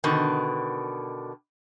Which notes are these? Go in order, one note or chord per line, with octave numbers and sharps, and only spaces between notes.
B2 D3 D#3